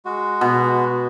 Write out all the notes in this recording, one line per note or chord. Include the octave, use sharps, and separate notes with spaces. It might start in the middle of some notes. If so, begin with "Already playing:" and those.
G#3 F#4
B2